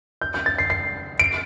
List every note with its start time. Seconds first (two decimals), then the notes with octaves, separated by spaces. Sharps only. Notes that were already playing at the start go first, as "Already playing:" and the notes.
0.21 G6
0.34 G6
0.46 A6
0.58 C7
0.70 C7
1.19 D7